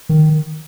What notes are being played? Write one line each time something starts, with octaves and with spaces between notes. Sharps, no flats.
D#3